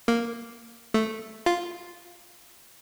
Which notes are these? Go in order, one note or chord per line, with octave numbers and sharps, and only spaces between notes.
A#3
A3
F4